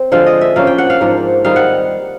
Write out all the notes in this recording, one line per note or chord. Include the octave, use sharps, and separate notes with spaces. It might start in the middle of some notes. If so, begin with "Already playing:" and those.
Already playing: C4
D3 F3 G#3 F5
D#5
E5
F3 A#3 C#4 F5
G5
F#5
F5
G#2 F3 A#3 D4
D#3 G3 C4 D#4 F5
F#5